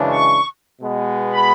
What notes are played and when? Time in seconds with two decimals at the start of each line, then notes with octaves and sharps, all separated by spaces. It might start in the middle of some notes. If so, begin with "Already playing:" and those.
Already playing: F#2 C#3 E3 G#3 D4
0.10 C#6
0.79 B2 G#3 B3
1.31 B5